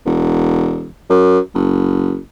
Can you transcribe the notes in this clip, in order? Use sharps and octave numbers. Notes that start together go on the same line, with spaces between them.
E1
F#2
F#1